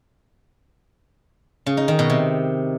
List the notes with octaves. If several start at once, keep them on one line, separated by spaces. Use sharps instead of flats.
C#3
D#4
D#3
B2
C3